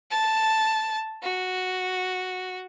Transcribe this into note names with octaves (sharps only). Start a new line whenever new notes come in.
A5
F#4